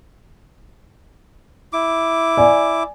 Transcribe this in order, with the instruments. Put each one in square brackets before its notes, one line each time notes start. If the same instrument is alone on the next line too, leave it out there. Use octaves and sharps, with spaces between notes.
[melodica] E4 D6
[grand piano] D5 G#5